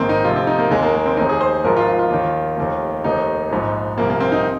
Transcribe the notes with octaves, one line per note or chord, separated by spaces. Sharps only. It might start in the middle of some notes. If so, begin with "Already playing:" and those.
Already playing: A#1 G#2 D#3 A#3 C4
D#4
F1 F2 C3 F4
C4
D#4
A#3
D#2 D#3 G#3
A#3
A#3
C4
F1 D#2 D#3 D#4
G#4
C5
G#1 G#2 F3 A#4
F4
F4
F4
D#2 D#3
F1 D#2 D#3
F1 D#2 D#3 D#4
A#1 G#2 F3
C2 A#2 F3 A#3
A#3
C4
D#4